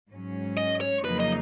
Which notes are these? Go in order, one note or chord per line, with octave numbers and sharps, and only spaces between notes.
G#2 F#3 C#4
D#5
C#5
F2 C#3 F#3 A#3 D#4 B4
D#5